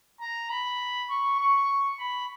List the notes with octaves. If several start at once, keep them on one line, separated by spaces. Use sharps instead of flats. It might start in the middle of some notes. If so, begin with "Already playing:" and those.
A#5
B5
C#6
C#6
B5